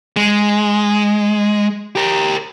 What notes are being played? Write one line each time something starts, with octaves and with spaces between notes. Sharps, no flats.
G#3
G4 A#4